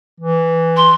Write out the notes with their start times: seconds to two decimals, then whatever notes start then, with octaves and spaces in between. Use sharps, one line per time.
0.20 E3
0.77 C6